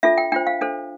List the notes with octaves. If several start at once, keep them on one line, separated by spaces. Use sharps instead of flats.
D4 F4 A4 E5
G5
D4 F4 C5 G5
F5
D4 A4 C5